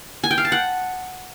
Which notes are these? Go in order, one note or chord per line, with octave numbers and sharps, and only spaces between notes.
G#5
G5
F5
A5
F#5